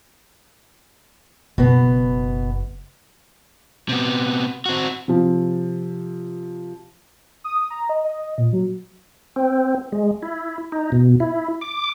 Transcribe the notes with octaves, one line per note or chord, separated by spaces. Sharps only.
F#1 B2 B3
C3 B3
C4 F#4
C3 F3
D#6
A#5
D#5
D#5
A#2
F#3
C4
G#3
E4
D#4
B2
E4
D6